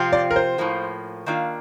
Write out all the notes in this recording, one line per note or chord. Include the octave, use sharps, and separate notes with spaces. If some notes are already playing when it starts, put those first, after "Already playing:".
Already playing: C3 F3 C4 F4
D5
A#4
C5
A2 F3 A#3
D#3 A#3 D4 F4